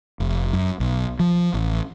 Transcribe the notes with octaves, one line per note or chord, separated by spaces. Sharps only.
F1
F#2
B1
F3
A1